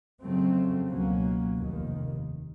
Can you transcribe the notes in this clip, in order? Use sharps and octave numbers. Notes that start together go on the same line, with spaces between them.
F2 C#3 F#3 A3 C4
C#2 B2 F#3 A#3 C#4
F1 D#2 D#3